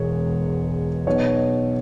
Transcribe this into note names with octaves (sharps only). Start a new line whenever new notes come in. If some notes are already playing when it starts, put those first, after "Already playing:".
Already playing: E1 E2 B2 G#3 C#5
B1 B2 B3 C#5